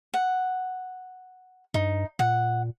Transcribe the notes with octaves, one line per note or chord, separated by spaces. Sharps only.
F#5
G2 D#4
A#2 F#5